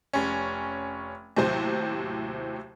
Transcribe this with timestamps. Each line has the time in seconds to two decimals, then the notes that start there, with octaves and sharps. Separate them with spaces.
0.13 F1 C#4
1.37 D#2 A2 C3 F#3 C5